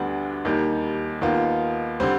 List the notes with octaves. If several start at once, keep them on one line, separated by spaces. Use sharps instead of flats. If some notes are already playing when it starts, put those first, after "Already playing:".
Already playing: D2 D3 G3 B3 D4
D#2 D#3 G3
D#2 D#3 B3 F4
D3 G3 C4